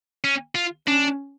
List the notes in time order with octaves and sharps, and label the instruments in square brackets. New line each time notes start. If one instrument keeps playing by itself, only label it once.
[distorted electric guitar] C#4
F4
[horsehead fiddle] C#4 [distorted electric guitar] D4